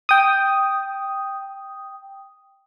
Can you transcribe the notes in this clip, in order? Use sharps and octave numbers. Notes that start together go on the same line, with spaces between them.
G5 D#6